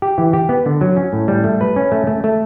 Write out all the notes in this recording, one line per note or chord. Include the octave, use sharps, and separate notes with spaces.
G4
E3
G4
B3
D3
F#3
C#4
A2
G3
A3
B4
C#4
A3
A3
A3